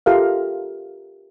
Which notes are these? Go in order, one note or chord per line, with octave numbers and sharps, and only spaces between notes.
F4 G4 A4 A#4 E5 F5